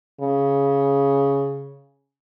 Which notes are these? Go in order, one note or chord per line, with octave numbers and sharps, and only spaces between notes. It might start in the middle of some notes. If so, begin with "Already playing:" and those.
C#3